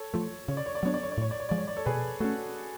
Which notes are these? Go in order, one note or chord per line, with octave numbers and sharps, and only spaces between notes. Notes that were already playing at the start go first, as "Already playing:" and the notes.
Already playing: A4 C#5
F3 A3
C#3 C#5
D5
C#5
D5
F#3 B3 D4 C#5
D5
C#5
D5
A2 C#5
D5
C#5
F3 G#3 D5
C#5
D5
A4 C#5
B2 G#4 B4
A3 C#4 F#4 A4